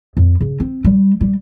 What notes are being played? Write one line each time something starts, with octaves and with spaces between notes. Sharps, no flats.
F2
C#3
C4
G3
G3